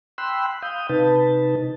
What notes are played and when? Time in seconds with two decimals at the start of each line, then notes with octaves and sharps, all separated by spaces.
0.18 G5 B5 C6 E6 F#6
0.62 F5 D#6 G6
0.89 C3 D#4 B4 A5